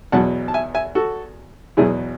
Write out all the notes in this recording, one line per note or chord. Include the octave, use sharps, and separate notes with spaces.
E2 B2 F#3 F#5 A5
A5
E5 G#5
E5 G#5
F#4 A4
E2 B2 F#3 E4 G#4